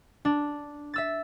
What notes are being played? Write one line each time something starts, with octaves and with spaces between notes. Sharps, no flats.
D4
E5 E6 A6